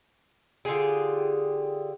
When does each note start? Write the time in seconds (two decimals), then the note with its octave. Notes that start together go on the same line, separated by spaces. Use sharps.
0.65 D3 F4 G4 G#4